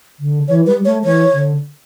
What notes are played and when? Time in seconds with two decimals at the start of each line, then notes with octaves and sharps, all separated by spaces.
0.19 D3
0.48 E3 C#5
0.66 G3 B4
0.85 A3 C#5
1.04 E3 C#5
1.32 D3